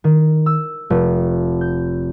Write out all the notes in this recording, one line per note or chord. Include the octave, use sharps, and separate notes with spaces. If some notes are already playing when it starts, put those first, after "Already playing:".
D#3
E6
F1
G6